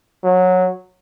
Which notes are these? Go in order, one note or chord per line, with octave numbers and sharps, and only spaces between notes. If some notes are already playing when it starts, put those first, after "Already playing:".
F#3